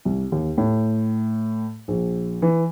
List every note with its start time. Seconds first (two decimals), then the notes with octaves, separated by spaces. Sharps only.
0.05 C2
0.32 D#2
0.58 A2
1.88 A#1
2.42 E3